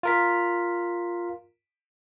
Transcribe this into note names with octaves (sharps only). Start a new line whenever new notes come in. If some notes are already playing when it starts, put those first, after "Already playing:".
F4 A#4 B6